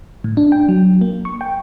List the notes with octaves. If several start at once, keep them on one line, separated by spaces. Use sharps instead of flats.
A2
D4
G5
F#3
A#3
C#6
G5